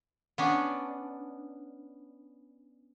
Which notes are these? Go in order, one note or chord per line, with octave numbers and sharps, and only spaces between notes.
B3 C#4 D4